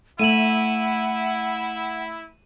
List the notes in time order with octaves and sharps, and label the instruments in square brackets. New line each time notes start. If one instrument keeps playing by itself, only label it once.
[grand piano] A3 [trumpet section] E4 [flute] F#5 [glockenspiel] D#7 E7 F#7